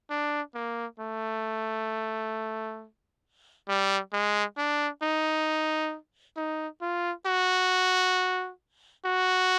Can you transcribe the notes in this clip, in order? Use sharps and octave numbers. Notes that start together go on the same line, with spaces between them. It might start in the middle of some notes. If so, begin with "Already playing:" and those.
D4
A#3
A3
G3
G#3
D4
D#4
D#4
F4
F#4
F#4